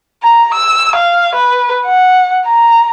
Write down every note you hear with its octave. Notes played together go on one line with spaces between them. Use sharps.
A#5
E6
F5
B4
F#5
A#5